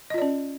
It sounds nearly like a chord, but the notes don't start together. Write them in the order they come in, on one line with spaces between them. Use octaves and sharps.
D#5 F4 D5 C#4